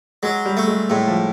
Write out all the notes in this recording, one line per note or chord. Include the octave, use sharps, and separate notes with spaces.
F#3 G#3
G3
A3
G#3
A2 G#3
F3